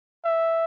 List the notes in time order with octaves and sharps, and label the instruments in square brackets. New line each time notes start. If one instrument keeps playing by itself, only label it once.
[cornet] E5